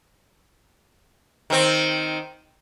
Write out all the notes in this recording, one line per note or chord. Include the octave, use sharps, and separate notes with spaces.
D#3 C4